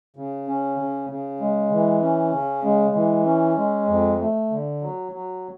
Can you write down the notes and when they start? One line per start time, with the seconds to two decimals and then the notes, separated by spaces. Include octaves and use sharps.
0.17 C#3
0.47 C#4
0.79 C#3
1.10 C#3
1.40 G#3
1.72 E3
2.02 C#4
2.33 C#3
2.64 G#3
2.95 E3
3.26 C#4
3.57 G#3
3.88 F2
4.20 A3
4.50 D3
4.82 F#3
5.12 F#3